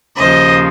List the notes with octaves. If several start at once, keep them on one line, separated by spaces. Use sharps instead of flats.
D#2 C#3 F3 C5 D#5